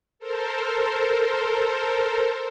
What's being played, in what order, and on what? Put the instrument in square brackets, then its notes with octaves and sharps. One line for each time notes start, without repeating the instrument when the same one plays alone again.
[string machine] A4 A#4 C5